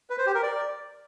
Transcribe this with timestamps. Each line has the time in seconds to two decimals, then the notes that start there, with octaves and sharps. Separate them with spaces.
0.10 B4
0.18 C5
0.26 G4
0.35 A#4
0.43 D5